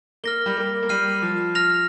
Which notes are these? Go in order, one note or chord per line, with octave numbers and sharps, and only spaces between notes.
A#3 F6 A#6 G7
G3
A#3
A#3
G3 F6 C7 D#7
F3
F6 A#6 F7